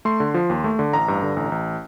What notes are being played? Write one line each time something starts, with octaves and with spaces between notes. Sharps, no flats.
A3 C6
D3
F3
D#2
A3
D3
A1 A#5
G2
D3
A1
A1